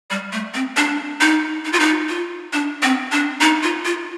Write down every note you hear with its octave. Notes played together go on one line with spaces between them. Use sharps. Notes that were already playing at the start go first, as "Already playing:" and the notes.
G3
A3
C4
D4
D#4
D#4
F4
D#4
F4
D4
C4
D4
D#4
F4
F4